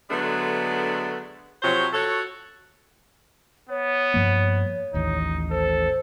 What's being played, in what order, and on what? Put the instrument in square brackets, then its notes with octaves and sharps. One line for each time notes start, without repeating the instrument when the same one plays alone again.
[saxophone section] D3 F#3 G#3 A3 B3 D4
C3 F3 F#3 C5 C#5
F#4 A4 C#5
[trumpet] B3 [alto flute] C#5
[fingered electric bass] G2 F3 A#3
[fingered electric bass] A1 D#2 [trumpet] D#4
[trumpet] A4 [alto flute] C5